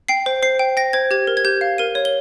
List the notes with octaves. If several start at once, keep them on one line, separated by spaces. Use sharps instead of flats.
G5 C7
C5
C5 C7
G5
G5 A#6
C5 G#6
G4 G#6
A#4
G#6
G4 G6
F5
A#4 D#7
C#5
G7